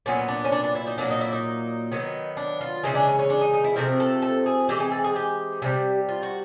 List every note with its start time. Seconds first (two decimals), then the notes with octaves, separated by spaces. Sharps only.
0.06 A#2 F#3 B3 C#4
0.28 D4
0.45 C#4
0.52 D4
0.63 D4
0.75 E4
0.87 D#4
0.98 A#2 F#3 A#3 D4
1.10 D#4
1.21 E4
1.33 D#4
1.92 D#3 F#3 B3
2.37 D4
2.61 F4
2.83 C#3 E3 G#3 D#4
2.95 D4
3.07 C#4
3.19 C#4
3.30 D4
3.41 D#4
3.54 D#4
3.64 E4
3.76 C3 F3 A3 C4 A#4
4.00 A4
4.22 A4
4.46 G#4
4.69 E3 G#3 C4 G4
4.80 G#4
4.92 A4
5.04 G#4
5.16 G4
5.62 C3 D#3 G3
6.09 F4
6.23 F#4